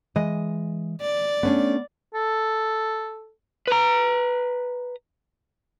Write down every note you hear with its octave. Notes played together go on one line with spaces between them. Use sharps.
E3 G#3 D#5
D5
A3 B3 C#4 D4
A4
B4 A#5